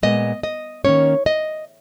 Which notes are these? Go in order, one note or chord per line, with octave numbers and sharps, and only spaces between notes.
A#2 G#3 B3 D#5
D#5
D#3 A#3 C#4 C#5
D#5